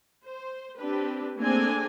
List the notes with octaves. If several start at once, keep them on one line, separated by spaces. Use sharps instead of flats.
C5
C4 D4 G4 B4
A3 A#3 C4 D4 G#4 G#5